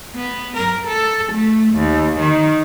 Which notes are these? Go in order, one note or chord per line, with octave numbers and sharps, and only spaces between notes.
B3
A#4
A4
A3
D#2
D#3